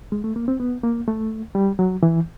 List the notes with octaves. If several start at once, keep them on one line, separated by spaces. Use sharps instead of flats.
G#3
A3
A#3
C4
B3
A#3
A3
G3
F#3
E3